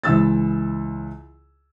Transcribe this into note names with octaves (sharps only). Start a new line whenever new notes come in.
C#2 E3 E6 A6